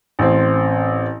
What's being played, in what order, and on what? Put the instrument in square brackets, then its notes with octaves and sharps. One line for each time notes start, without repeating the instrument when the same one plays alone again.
[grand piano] A1 C4